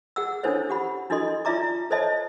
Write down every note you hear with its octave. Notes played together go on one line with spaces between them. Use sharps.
G#4 F#5 E6
C#4 D4 E4 A4 C5 C#5
G4 F#5 B5
D4 E4 F#4 A4 D#5 C6
D#4 F4 D5 E5 A#5 D6
A4 C5 C#5 D#5 E5 A5